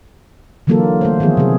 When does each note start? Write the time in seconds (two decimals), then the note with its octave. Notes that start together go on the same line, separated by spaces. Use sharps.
0.67 D3 E3 F#3 A#3 F4 A4
1.01 A3 A4 C5
1.20 D#3 F3 B3 G#4
1.37 C3 F#3 G#4